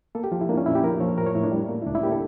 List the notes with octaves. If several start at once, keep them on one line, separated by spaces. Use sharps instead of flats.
A#3 A4
G4
F3 F4
E4
A#3 D4
C#4
A#2 E4
G4
F3 A#4
F3 C#5
A2 A#4
C#5
A2 E4
D4
G3
A#3
E4
C#2 D4
E4
A#3 G4
A4